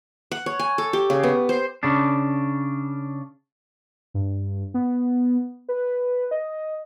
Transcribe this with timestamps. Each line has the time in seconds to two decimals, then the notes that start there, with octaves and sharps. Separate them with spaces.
0.31 F#5
0.46 C#5
0.59 G#5
0.78 A4
0.93 G4
1.10 C#3
1.23 B3
1.49 C5
1.83 C#3 D4
4.14 G2
4.74 B3
5.69 B4
6.31 D#5